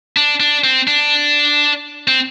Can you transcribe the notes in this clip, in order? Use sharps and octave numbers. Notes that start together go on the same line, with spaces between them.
D4
D4
C4
D4
C4